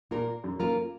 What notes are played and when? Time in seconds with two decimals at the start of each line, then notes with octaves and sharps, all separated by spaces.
0.11 A#2 A#3 F4 A#4
0.44 F#2
0.59 F#2 A#3 F4 A#4